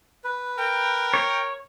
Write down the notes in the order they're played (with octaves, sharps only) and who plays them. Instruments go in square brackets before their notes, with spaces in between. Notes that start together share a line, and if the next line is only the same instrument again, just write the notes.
[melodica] B4
[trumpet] A#4 [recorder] G5
[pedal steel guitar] C#5